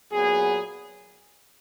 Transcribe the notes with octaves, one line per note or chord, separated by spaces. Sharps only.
A#2 F#3 B3 G#4